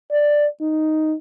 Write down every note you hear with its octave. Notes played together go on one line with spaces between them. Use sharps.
D5
D#4